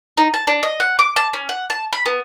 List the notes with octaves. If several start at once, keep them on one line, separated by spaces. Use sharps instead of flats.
D#4
A5
D4
D#5
F#5
D6
A5
C#4
F#5
A5
B5
B3